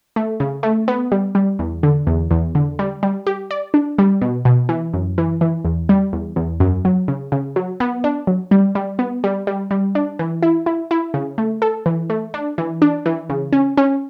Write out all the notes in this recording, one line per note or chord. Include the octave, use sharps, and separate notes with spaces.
A3
C#3
A3
B3
G3
G3
E2
D3
E2
E2
D3
G3
G3
G4
D5
D4
G3
B2
B2
E3
F#2
E3
E3
E2
G3
E2
E2
F#2
F#3
C#3
C#3
F#3
B3
D4
F#3
G3
G3
B3
G3
G3
G3
D4
E3
E4
E4
E4
C#3
A3
A4
E3
A3
D4
E3
D4
E3
C#3
C#4
C#4